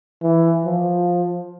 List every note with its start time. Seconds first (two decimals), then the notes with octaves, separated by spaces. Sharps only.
0.22 E3
0.65 F3